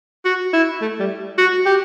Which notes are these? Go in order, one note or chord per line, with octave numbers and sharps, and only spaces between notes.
F#4
E4
A3
G3
F#4
G4